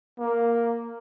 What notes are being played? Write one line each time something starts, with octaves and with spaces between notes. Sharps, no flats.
A#3